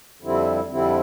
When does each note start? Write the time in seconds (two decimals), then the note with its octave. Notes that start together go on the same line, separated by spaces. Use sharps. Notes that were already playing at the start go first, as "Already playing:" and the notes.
0.22 F2 D3 G3 C4 E4
0.69 F2 D3 G3 C4 E4